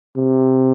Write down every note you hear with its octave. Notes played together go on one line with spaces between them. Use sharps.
C3